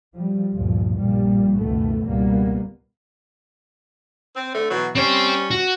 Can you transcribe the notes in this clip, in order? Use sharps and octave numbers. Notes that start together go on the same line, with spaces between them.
F3 G3
G1 D2 G2 A#2 F3
A#1 G2 A#2 F3 G3 A#3
C#2 F#2 B2 D#3 A3 B3
G#1 C#2 B2 G3 A#3 B3
C4
D3 A3
B2 E3 F#3
G3 C4 C#4 C5
F#4